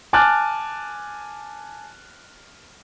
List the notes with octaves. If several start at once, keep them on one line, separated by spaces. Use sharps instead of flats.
G#5 A5 D6 F6 F#6 A6